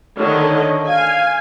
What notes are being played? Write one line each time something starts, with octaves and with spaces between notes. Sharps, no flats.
D3 D#3 C#5 D#5
F5 G#5